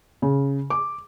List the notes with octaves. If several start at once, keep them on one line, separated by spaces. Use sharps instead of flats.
C#3
D6